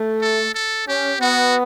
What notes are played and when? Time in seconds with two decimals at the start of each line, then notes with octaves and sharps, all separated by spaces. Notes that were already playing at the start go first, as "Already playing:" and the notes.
Already playing: A3
0.21 A4
0.54 A4
0.87 C#4 G4
1.20 B3 F#4